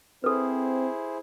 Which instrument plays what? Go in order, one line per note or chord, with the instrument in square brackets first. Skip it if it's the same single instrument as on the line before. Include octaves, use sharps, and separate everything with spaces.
[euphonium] C4 [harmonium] E4 G#4 C5 [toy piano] A4 B4